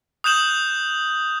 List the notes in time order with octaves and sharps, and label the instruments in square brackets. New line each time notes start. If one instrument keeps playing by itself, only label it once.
[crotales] D#6 F#6 G6 E7 F#7